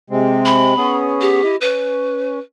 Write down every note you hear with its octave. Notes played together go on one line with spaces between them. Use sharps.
C3 G#3 C4
B5
B3 C#4 G#4
G4
E4 D#5
C#4 B4